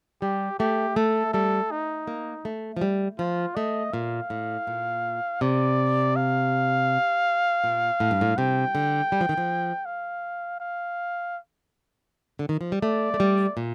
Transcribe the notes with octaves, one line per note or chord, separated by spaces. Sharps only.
G3 G4
A3 G4
A3 A4
G3 A4
D#4
A#3
A3
F3
G3
F3 F4
A3 D#5
A#2 F5
A2
A#2
C3 D5
F5
A#2
A2
G2
A2
C3 G5
D3
G3
F3
D#3
F3
F5
F5
D3
D#3
F3
G3
A3 D5
A3
G3
A#2